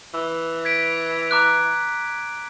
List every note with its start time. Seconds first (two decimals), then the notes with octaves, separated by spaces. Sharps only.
0.14 E3
0.65 G#6 B6 D7
1.31 A#5 D6 F#6